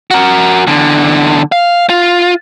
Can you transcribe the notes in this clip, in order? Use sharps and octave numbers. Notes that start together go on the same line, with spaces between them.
F#4 A#4
E2 D3
F5
F4